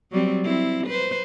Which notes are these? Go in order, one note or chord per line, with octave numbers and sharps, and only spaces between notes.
F#3 G3 C4
C4 E4
B4 C5